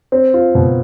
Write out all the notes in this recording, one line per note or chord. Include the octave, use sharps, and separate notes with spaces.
C4
F4
B2